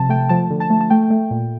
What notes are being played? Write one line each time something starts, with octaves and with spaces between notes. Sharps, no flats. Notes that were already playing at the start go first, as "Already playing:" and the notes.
Already playing: C3 F3 A5
A3 G5
F3 A5
D3
A5
A3
A5
A3 G5
A3
A#2